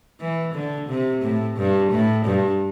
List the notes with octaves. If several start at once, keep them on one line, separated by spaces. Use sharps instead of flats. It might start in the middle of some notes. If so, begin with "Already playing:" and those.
E3
D3
C3
A2
G2
A2
G2